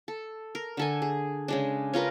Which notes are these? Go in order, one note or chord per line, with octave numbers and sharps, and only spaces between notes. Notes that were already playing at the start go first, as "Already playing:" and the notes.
A4
A#4
D3 A4 G#5
G#4
C#3 G#3 D4
C#4 F4 A#4 B4